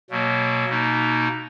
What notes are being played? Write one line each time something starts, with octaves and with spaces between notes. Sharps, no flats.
B2 F#3 A#3
B2 A#3 D#4